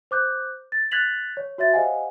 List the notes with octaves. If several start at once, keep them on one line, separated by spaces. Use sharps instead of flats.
C5 D6 F#6 G6
A6
F#6 G#6 A6 B6 F7 F#7
C#5
F#4 C#5 E5 A6
G4 C5 D#5 F5 F#5 G#5